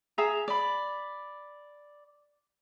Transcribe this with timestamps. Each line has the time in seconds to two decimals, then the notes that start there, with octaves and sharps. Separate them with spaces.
0.18 G#4 E5 A#5
0.48 D5 B5